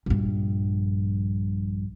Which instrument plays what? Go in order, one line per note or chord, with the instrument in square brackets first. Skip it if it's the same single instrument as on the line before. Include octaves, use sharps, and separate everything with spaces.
[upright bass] A#1 G2